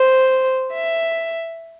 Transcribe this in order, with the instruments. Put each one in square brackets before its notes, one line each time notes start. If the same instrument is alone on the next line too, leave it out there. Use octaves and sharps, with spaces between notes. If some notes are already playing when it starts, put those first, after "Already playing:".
Already playing: [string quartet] C5
E5